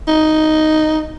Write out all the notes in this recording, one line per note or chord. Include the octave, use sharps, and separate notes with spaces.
D#4